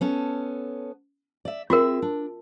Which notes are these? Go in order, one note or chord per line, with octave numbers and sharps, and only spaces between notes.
B3 C#4 A4
D5 E5
C4 F4 F#4 G#4 A#4 E5
D4